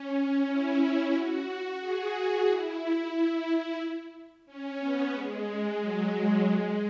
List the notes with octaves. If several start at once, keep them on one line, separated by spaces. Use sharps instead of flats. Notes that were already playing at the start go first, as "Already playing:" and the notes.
Already playing: C#4
C#4
E4
F#4
G#4
E4
C#4
B3
G#3
F#3
F#3
G#3